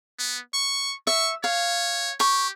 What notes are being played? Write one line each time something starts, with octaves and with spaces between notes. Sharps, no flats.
B3
C#6
E5 C#6
C#5 F5
G4 C#6